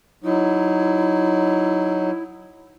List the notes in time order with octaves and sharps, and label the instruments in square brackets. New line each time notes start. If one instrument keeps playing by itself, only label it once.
[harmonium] F#3 D#4 [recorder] E4